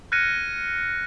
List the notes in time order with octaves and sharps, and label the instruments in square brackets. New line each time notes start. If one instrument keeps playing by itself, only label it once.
[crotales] F6 F#6 G#6 A#6 C#7 D#7